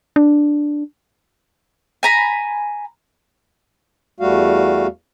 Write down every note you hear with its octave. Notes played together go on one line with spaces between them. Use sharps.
D4
G#5 A#5 B5
E2 G3 A3 F#4 F5